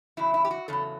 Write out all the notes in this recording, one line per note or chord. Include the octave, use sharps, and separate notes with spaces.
E2 C#3 F#3 E4
E4
G4
F#4
E2 C#3 F#3 A4